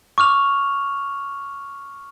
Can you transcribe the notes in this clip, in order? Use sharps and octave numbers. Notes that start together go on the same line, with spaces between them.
C#6 D6 F6 F7